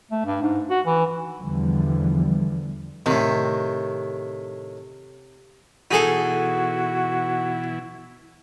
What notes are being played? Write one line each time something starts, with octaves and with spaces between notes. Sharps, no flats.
A3
G2
G#2
F#4
E3
E2 D3 E3 F3 G3
A2 C3 D#3
B2 E3 D#4 E4 F#4 G#4 A4